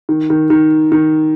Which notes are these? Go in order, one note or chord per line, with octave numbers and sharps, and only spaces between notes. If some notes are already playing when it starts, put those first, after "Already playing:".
D#3
D#3
D#3
D#3